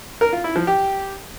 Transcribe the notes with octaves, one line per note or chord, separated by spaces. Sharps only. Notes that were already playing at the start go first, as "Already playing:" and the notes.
A#4
F4
E4
F3
G4